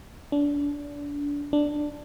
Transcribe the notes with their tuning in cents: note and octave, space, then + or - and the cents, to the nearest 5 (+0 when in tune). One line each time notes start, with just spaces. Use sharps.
D4 -30
D4 +5